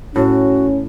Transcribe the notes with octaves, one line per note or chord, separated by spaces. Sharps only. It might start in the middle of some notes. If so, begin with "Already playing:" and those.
A2 C#4 F#4